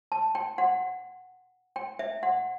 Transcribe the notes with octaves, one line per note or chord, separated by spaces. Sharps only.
A5
G5
F#5
G5
E5
F#5